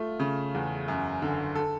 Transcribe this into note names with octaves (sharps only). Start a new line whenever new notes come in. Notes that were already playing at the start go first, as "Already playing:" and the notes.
Already playing: A3 F4
C#3
E2
F#2
D3
A4